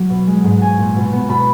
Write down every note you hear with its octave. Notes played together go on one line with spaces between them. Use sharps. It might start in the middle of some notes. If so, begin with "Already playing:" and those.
Already playing: F#3
B2
G#3
G#2
C#4 G#5
A#2
B2
B3
B2 B5